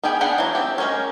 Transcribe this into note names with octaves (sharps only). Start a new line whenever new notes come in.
B3 G4 G#4 G5 G#5
B3 D4 G#4 F#5 G5
E3 F#3
C4 G4
G#3 C#4 G4 A#4 C#5